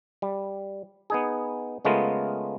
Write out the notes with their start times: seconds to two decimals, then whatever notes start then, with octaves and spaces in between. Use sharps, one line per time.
0.22 G3
1.10 B3 D#4 G#4
1.85 C#3 G#3 A3 B3 F4 A#4